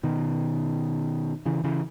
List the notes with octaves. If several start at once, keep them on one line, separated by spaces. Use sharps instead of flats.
B2 D#3
C#3 E3
C#3 E3